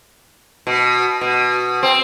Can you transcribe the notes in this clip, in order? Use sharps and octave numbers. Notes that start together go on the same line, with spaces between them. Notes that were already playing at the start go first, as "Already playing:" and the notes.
B2
B2
C4